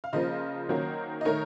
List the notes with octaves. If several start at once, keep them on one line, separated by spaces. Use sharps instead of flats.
F5
C#3 F3 A#3 F4 C5 D#5
D#3 F#3 A#3 C#4
D#5
D#3 A3 D#4 A#4 C#5